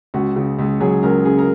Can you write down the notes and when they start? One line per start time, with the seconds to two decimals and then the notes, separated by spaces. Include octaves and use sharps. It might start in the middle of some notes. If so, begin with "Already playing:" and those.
0.14 C#2 F#4
0.36 C#3
0.59 C#2
0.80 F#3 G#4
1.03 C#2 A#4
1.25 C#3 G#4
1.38 A#4